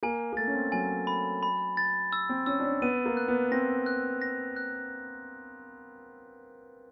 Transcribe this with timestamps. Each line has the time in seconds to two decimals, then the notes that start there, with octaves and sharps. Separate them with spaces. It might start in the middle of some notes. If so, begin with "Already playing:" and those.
0.03 A#3 G#5
0.33 A#3
0.37 A3 A6
0.47 C#4
0.55 C4
0.72 F#3 G#5
1.07 B5
1.43 B5
1.77 A6
2.13 E6
2.29 C4
2.46 C#4 E6
2.59 D4
2.64 C#4
2.82 B3 D#7
3.06 A#3
3.17 F#6
3.28 B3
3.51 C4 A#6
3.86 F#6
4.22 A#6
4.56 F#6